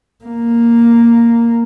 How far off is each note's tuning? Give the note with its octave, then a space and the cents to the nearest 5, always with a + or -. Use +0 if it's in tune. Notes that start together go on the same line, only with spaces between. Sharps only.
A#3 +0